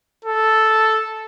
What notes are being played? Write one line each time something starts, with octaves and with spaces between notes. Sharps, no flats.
A4